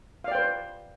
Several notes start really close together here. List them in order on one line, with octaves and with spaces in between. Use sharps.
F5 D5 G5 C5 B4